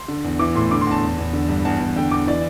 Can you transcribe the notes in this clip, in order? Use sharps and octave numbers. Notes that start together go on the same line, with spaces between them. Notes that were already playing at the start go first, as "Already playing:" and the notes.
Already playing: C6
D3
E2
E3 D6
A2 C6
D3 D6
C6
E2 A5
E2
E2
D3
G2
E2 A5
E2
D3 G5
E2 D6
E3 D5